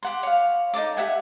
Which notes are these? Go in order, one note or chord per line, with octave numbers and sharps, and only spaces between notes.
G4 F#5 C6
C#5 F5
D#4 F4 A4 D6
G4 E5 F#5 G#5